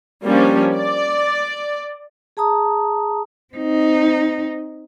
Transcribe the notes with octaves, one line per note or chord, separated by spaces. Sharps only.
F3 G3 A#3 C#4 D4
D5
G#4 A5 A#5 D#6
C4 D#4